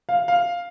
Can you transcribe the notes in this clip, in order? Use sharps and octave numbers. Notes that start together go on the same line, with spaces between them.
F5
F5